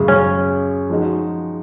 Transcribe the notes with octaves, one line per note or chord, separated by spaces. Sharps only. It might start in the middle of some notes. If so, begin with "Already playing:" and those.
Already playing: F#2 C#3 G#3
C#4
F3 G#3 D#4 F#4